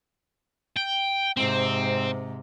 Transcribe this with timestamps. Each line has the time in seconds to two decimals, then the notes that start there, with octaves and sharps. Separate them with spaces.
0.77 G5
1.37 G#2 C3 C4